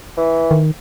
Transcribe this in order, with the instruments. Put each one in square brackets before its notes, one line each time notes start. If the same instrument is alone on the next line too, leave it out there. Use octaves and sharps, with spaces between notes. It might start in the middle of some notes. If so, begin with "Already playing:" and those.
[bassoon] E3
[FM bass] D#3